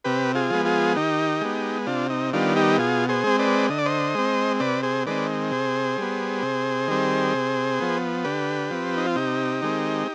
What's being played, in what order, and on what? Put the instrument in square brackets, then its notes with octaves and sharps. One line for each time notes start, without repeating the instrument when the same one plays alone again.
[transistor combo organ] C3 G4 B4
F4 G#4
F3 G#3 B3
F4 G#4
D#3 D#4 G4
G#3 B3
C3 D4 F4
D#4
D#3 G3 B3 D4 F4
D#4 G4
B2 F4 G#4
G#4 C5
G#3 C4
B4 D5
D3 D#5
D5
C5 D#5
G#3 C4
C3 B4 D5
G#4 C5
D#3 G#3 C4 B4 D5
C3 G#4 C5
G3 B3
C3
D#3 G3 C4
C3
F3 B3
D3 G4 B4
F3 C4
D#4
F4
C3 D#4 G4
D#3 G#3 C4